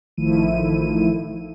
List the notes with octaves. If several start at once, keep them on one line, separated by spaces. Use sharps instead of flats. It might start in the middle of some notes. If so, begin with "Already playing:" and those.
A1 D#3 F3 A3 E4 D#7